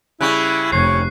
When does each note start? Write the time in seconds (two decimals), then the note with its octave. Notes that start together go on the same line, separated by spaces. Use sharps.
0.21 C#3 G3 E4 C#6 F#6
0.72 F1 C#5 C7